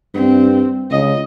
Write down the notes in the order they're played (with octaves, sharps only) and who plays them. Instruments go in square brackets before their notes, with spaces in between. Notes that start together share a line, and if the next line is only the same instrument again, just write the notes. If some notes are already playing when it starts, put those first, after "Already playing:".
[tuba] G2 [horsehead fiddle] C4
[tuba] C#2 [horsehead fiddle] D#5